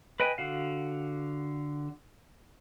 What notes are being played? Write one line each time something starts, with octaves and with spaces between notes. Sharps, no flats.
B4 D#5 G5 G#5
D3 F#4 F5